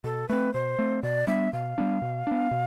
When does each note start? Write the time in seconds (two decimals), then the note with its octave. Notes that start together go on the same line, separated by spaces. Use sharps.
0.04 B2 A4
0.29 A3 C4 B4
0.54 B2 C5
0.79 A3 C4
1.03 B2 D5
1.27 G3 B3 D4 E5
1.53 B2 F5
1.78 G3 B3 D4
2.02 B2
2.27 B3 D4
2.51 B2